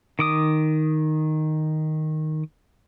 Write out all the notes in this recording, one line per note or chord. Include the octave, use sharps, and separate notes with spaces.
D#3 D6 D#6